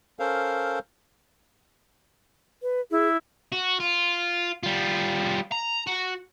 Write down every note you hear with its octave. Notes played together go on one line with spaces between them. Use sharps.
C#4 A4 A#4 C5 F5
B4
E4 G#4
F#4
F4
G3 F4
A#5
F#4